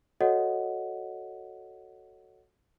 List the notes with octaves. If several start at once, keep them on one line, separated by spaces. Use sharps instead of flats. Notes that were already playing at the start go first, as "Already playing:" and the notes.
F#4 A4 C#5 D#5 F#5